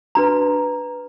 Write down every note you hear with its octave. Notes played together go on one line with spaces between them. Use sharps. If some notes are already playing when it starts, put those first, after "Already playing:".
D4 F#4 B4 A#5